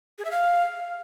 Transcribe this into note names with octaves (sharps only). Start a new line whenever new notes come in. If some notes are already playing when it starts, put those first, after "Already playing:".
G#4
E5
F5